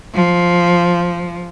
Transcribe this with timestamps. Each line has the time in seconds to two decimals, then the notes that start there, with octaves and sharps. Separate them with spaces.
0.15 F3